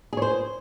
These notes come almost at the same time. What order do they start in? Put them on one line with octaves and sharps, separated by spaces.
G#4 C#5 C5